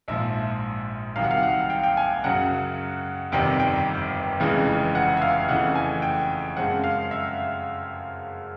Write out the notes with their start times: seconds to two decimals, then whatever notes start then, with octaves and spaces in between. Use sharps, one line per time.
0.08 A#1 G#2 F3 E5
1.16 C2 C3 D#3 F#3 F5
1.24 F#5
1.31 F5
1.43 F#5
1.70 G5
1.83 G5
1.97 G#5
2.24 F#2 C#3 F#3 F#5
3.32 G1 F2 C3 D#3 G3 G5
3.60 G5
4.40 F1 F2 C#3 E3 G#3
4.95 F#5
5.17 E5
5.22 F5
5.49 F2 C#3 E3 A3 F#5
5.75 G#5
6.02 G5
6.56 F#2 C#3 F3 G#3 C4 F#5
6.84 F5
7.11 E5